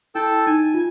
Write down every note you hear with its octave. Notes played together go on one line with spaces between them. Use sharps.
E4 A4 G5 E6
D#4 G#5
F4